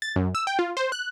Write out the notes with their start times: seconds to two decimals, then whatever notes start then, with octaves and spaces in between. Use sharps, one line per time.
0.02 A6
0.16 F#2
0.35 E6
0.47 G5
0.59 F4
0.77 C5
0.92 F#6